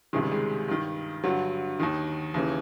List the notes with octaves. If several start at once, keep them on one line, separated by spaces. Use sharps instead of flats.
C#2 C3 D#3 G#3
G3
G#3
G2 D#3
G2 D3 F#3
D#2 D#3
D#2 C#3 E3